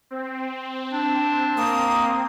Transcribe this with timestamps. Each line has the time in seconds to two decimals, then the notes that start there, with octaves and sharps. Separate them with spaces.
0.11 C4
0.92 D4
1.58 A#3 D#6